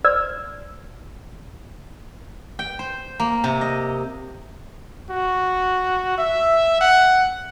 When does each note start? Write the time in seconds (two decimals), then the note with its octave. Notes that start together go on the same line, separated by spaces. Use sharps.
0.04 C5 D5 E6 F6 G#6
2.59 G5
2.79 C5
3.20 A#3
3.44 C3
3.61 D#5
5.10 F#4
6.18 E5
6.81 F#5